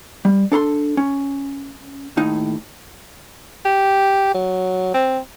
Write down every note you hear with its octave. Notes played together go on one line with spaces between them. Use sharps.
G3
D4 A4 A#5 C6
C#4
D#2 A2 D#4
G4
F#3
C4